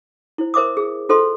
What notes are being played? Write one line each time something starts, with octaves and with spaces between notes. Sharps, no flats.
E4 C5
A#4 C5 E5 D6 D#6
G#4
F4 A4 C5 D#5 C6